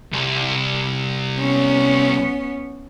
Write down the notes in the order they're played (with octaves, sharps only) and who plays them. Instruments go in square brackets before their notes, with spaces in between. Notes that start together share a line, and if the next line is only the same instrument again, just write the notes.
[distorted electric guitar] C2
[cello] B3 C#4